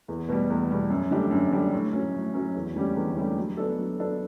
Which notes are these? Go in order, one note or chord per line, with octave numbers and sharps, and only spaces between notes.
E2
B2 G3
E2
B2 G3
F#2
D3 G3 D4 G4
F#2
D3 G3 D4 G4
A2
F#3 C#4
A2
F#3 C#4
E2
D3 G3 C#4 G4
E2
D3 G3 C#4 G4
F#3
B3 D4 A4
F#3
B3 D4 A4